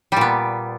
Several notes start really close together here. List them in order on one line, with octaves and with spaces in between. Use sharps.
G3 A#2 B3